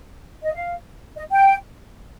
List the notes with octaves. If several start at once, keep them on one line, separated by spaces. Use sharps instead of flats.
D#5
F5
D#5
G5